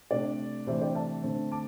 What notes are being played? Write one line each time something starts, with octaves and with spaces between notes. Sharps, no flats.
C3 A3 D4 D5
C3 E3 A3 D4 C5 E5
D5 G5
E5 A5
D3 A3 C4
A5 D6